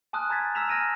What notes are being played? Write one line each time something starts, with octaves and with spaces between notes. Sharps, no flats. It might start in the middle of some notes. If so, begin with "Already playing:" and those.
G#5 A5 C6 D#6 F6 F#6
G#5 A#5 G#6 A6 B6
A#5 E6 F6 B6 E7 F7
G#5 F6 G#6 A#6 D7 D#7